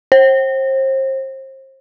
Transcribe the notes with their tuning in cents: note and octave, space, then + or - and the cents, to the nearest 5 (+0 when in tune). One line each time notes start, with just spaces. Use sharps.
C5 +35